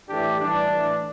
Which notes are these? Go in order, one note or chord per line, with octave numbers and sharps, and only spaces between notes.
A2 E3 A3 D4 G4
A2 E3 G3 D4
A2 E3 A3